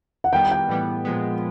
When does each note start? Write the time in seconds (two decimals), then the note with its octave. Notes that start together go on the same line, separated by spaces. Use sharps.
0.24 F#5
0.33 D#3 G3 B3 G5
0.51 G5
0.69 A2 E3 G3 B3
1.05 A#2 F3 G#3 B3